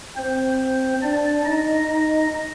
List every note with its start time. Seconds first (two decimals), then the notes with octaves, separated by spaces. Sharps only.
0.16 C4 C5
1.02 D4 D5
1.45 D#4 D#5
1.88 D#4 D#5